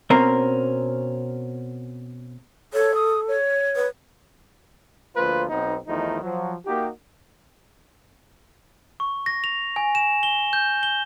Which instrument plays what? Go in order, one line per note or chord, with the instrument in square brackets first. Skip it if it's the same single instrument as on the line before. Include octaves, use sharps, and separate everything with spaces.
[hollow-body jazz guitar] B2 C4 C#4 A#4
[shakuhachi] A4 [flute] C#5
[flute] D#6
C#5
[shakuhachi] B4
[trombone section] D2 F3 A#3 F4 B4 C5
B1 B3 C4 D#4
E2 D#3 F3 A3 D#4 E4
F3 F#3
A#3 D#4 F#4 G4
[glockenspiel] C#6
A#6
F7
G#5
E7
G7
G6
G7